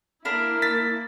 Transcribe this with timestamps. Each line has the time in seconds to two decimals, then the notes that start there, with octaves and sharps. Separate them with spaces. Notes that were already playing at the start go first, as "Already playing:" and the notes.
0.25 A#3 D4 E4 A#4 B5
0.62 A6 B6